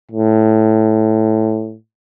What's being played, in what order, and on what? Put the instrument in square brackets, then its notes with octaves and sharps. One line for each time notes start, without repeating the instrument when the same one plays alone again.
[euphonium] A2